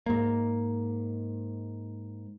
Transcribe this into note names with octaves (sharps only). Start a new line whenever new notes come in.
G#2 A#3